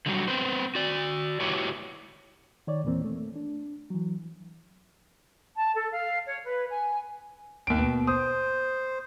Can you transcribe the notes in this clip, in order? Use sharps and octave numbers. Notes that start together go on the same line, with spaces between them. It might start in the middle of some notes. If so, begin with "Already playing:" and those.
D3 F#3 G3 F#4
B3 C4 B4 C5
F#4 D5
E4 F#4 G4 B4 C#5
D#3 C#5 D5
E2 A#2 E3 A#3 C4
A3
D4
E3 F#3
A5
A4
F5
C#5
B4
G#5
D#2 D7
B2
C5 D#6